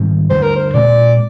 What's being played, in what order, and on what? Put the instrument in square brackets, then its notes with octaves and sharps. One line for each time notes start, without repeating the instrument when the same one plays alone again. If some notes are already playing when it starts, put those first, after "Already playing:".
Already playing: [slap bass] G#2 D#3 G3 C4
[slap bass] D2 D3 G3 [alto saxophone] C5
[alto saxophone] A#4
C5
[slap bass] A#2 G#3 C4 [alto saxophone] D5